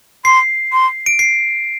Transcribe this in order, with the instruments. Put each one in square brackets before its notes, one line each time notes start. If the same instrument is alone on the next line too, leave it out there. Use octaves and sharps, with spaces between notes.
[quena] C6 [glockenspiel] C7
[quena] C6
[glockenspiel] D7
C7